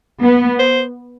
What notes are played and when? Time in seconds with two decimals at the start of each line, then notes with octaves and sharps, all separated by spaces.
0.22 B3
0.59 C5